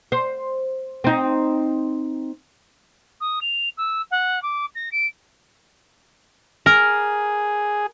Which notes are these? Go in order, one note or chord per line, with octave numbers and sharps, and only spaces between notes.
C5
C4 D#4
D#6
F7
E6
F#5
D6
A#6
D7
G#4 A#4